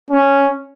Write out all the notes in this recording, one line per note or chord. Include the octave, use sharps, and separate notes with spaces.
C#4